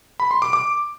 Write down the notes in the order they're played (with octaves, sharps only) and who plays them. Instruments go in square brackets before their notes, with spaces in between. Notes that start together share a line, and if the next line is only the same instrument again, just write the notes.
[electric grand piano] B5
C6
D6
D6